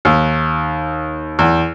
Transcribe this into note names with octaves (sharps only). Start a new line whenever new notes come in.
D#2
E2